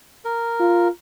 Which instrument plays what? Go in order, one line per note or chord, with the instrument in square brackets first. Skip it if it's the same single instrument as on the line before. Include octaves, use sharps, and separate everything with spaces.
[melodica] A#4
[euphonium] F4